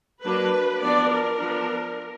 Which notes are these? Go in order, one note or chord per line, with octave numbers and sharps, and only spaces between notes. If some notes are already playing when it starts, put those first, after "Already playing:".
F#3 A#3 D4 B4
F3 B3 D4 D5
A#4
F3 B3 D4